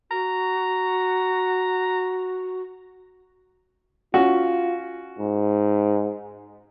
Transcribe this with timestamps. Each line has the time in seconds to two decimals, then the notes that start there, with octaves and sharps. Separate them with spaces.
0.11 F#4 A#5
4.14 C#4 F4 F#4
5.19 G#2